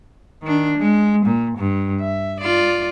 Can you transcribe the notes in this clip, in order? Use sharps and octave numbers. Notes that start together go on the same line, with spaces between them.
D#3 D4
G#3
A#2
G2
E5
F4 D5